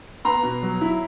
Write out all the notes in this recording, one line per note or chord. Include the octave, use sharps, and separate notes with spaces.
B3 A#5 C6
B2
F#3
E4